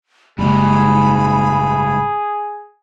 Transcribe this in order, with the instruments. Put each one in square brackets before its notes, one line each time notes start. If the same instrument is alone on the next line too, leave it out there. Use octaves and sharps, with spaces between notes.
[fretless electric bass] F#1 [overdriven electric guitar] G#2 G3 [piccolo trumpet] G#4 [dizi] B5